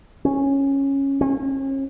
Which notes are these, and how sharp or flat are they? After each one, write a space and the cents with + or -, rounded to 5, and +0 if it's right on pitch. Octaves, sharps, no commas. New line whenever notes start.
C#4 -10
C#4 -40